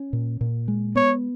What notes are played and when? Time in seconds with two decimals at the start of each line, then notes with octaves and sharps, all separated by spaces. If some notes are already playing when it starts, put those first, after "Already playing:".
Already playing: C#4
0.13 A#2
0.41 A#2
0.68 G#3
0.95 B3 C#5